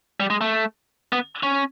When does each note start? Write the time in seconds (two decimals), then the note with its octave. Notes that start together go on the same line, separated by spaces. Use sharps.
0.20 G3
0.30 G#3
0.41 A3
1.12 B3
1.43 C#4